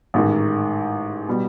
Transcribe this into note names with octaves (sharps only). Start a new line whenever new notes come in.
A1 G#2 D#3
B2 G3